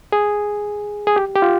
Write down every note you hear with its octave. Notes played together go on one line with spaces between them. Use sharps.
G#4
G#4
G4
G4
F4